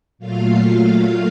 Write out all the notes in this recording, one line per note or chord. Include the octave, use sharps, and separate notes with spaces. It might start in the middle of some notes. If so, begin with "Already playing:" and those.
A#2 F#3 A3 F4 F5
F4 F5